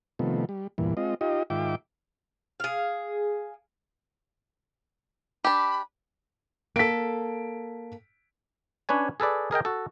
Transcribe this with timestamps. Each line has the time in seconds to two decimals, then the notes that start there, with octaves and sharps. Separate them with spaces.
0.19 C3 D#3 F3 A3 B3
0.49 G3
0.78 E2 G2 A#2 E3
0.97 G#3 C4 F4 D#5
1.21 D#4 F4 G4 D#5
1.50 G#2 D#3 F4 E5 G5 D6
2.60 G#4 F5
5.44 D4 G4 B5
6.76 A#3 A4 B6 D7
8.89 C#4 D4 B4 C#5 G#5
9.20 G#4 A4 B4 D5
9.51 G#4 A#4 D#5 G5
9.65 F#4 A4